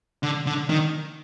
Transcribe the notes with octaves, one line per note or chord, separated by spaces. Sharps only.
D3
D3
D#3